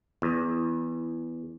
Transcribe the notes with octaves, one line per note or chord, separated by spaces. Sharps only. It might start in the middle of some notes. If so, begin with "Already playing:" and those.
E2